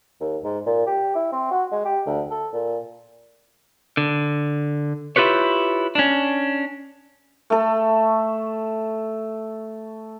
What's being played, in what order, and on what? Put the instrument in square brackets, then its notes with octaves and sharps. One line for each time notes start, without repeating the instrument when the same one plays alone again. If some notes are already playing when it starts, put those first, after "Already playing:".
[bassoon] D#2
G#2
A#2
G4
E4
C4
F#4
G#3
G4
D2
A4
A#2
[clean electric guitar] D3
E4 F4 G4 B4 C#5
C#4 D4
[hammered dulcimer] A3 A4